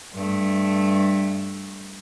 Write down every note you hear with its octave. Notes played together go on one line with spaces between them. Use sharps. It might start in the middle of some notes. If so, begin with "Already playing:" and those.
G2 A3